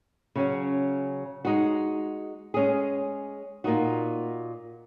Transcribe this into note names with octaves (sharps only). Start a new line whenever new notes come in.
C#3 F#3 C#4
G#3 D#4 F#4
G#3 C#4 G#4
A#2 A#3 D#4 F#4